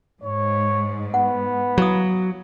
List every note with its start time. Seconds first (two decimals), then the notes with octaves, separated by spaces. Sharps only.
0.24 G#2 C#5
1.14 B3 F#5
1.78 F#3 E4 F5 D#6